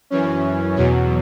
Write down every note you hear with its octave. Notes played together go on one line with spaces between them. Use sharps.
F#2 E3 C#4
E2 B2 F#3 C#4